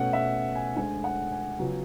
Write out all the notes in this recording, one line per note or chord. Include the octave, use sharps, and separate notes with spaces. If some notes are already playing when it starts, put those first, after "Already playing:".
Already playing: B2 A3 C#4 F#5
E5
G#5
D2 D3 G#3 G#5
F#5
G#5
C#2 C#3 F#3 B3